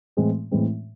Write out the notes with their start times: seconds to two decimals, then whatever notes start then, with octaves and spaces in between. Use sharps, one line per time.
0.17 A2 E3 G#3 C4
0.51 A2 E3 G#3 C4